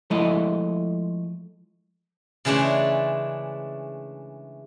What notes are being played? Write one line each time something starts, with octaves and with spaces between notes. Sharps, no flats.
F3 G#3 A3 E4 D#5
C#3 E3 G#3 A3 D4